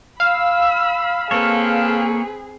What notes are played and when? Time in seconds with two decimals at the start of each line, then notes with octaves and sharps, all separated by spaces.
0.20 F5 B5 E6
1.31 A#3 C4 G#4 A4 B4 C#5